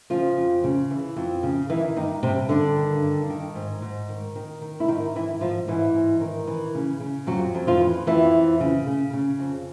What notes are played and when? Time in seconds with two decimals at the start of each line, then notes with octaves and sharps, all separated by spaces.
0.10 C#3 F3 F4
0.37 F2
0.64 C#3
0.91 E3
1.17 F2
1.43 C#3
1.69 D#3 E3 E4
1.96 G2 D#3 D#4
2.23 G2 C3 C4
2.49 G2 D3 D4
2.76 D#3
3.03 G2
3.30 D#3
3.55 G#2
3.82 G#2
4.09 D#3
4.36 D#3
4.62 D#3
4.80 E4
4.88 G#2 D#3 D#4
5.15 D#3 E3 E4
5.41 G#2 F3 F4
5.68 G#2 E3 E4
5.95 G#2
6.21 D#3
6.47 E3
6.75 C#3
7.00 C#3
7.27 F2 F#3 F#4
7.54 F2
7.67 F3 F4
7.81 E3
8.07 F2 E3 E4
8.34 F2
8.60 C#3
8.87 C#3
9.13 C#3
9.39 F2